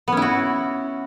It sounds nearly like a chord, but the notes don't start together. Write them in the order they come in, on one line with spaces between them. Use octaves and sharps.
B3 C#4 E4 F#4